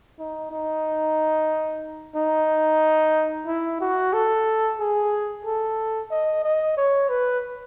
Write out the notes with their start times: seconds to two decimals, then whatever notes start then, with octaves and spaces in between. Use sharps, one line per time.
0.19 D#4
0.51 D#4
2.15 D#4
3.47 E4
3.81 F#4
4.13 A4
4.79 G#4
5.45 A4
6.11 D#5
6.44 D#5
6.77 C#5
7.09 B4